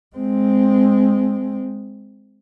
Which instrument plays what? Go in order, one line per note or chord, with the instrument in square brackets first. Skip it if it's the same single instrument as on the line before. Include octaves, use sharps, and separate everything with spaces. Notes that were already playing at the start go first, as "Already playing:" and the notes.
[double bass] G#3 C4